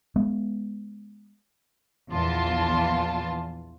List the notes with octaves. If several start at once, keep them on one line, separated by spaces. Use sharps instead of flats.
G#3 B3
A#1 E2 E3 F4 A5